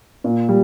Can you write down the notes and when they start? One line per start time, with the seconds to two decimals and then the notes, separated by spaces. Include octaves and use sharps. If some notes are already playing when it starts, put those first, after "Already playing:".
0.24 A#2
0.49 G3